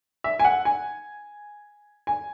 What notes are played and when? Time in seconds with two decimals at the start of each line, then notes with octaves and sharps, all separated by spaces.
0.24 E5
0.39 G#5
0.45 F#5
0.65 G#5
2.07 G#5